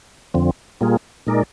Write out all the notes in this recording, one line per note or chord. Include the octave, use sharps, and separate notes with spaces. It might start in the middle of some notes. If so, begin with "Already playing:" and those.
F2 D3 F3 C4
A#2 G3 A#3 F4 G#4
A#2 G#3 D#4 A#4 D5